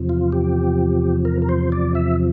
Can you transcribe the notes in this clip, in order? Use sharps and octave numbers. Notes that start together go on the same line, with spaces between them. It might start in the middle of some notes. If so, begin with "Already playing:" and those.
Already playing: E2 C3 F3
F4
G4
A#4
A#4
C5
D5
E5